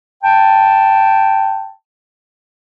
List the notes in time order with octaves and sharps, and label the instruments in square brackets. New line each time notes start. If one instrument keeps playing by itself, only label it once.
[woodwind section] G5 A5